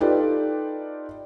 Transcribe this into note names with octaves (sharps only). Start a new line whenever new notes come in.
D#4 F4 G4 A4 B4 D5